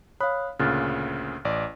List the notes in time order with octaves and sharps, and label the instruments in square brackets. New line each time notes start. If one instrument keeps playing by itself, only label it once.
[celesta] C#5 D#6 F#6 [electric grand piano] F5 B5
[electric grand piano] D2 A#2 C#3 [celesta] F6 F#6 A6
[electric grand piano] A1 D5